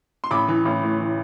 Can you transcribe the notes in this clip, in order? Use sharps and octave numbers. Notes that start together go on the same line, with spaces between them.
C6
A1 B5 D6
E3
A1
A2
E3